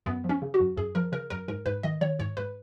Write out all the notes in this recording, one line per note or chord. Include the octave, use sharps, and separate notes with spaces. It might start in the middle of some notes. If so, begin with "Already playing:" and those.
F#2 B3
F3
C#4
C#3
F#4
F#2
F#2 G#4
F3 A#4
C#3 A#4
F#2 A#4
G#2 A#4
G#2 B4
D#3 D#5
D#3 C#5
G#2 C#5
G#2 B4